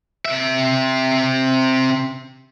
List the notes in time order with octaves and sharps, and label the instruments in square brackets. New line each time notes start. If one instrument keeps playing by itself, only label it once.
[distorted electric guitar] C3 E5